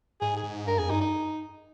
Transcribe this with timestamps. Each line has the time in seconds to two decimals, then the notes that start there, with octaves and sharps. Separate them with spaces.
0.21 G#2 G#4
0.36 G#4
0.44 G#2
0.67 G2 A#4
0.78 F2 G#4
0.89 G2 D#4
1.01 D#4